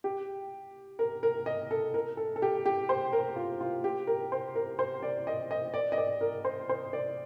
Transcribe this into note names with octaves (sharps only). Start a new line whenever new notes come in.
G4
A#4
A#4
D#5
A4
A#4
A4
A4
G4
G4
C5
A#4
F4
F4
G4
A#4
C5
A#4
C5
D5
D#5
D#5
D5
D#5
D5
A#4
C5
C5
D5